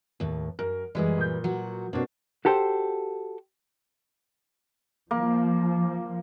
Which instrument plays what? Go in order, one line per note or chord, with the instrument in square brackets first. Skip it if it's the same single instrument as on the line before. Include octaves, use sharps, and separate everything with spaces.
[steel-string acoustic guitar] D#2 A2
[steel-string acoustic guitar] F#2 [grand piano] A#4
[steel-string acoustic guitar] F#2 E3 G3 [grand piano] G#3 G#4
[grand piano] A#2 G6
[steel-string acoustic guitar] F#3 F#4
[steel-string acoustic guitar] B2 C4 [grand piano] A#3 D4 F#4
[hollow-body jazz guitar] F#4 G4 A4 C5 G5
[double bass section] F3 [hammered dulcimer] A#3